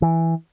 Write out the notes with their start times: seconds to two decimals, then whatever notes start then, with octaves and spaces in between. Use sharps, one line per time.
0.02 E3